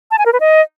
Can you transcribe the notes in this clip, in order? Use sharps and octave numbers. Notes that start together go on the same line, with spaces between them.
A5
G#5
A#4
B4
D#5